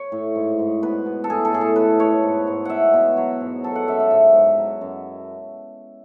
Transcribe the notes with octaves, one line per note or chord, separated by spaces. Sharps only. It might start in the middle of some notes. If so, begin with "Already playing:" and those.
Already playing: C#5
A2
G#2
G#2
B2 B4
B2
A4
A2 G#4
A4
A2 G#4
A4
B2 B4
B2 C#5
G#2
G#2
B2 E5 F#5
B2
F#3 C#5
G#2
F#3 A4
F#5
F#2 E5
E5
G#2 E5
G#2
F#3
F#2